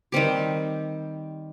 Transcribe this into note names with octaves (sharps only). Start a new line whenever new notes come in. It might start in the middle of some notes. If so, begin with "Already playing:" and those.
D#3 G3 C4 G4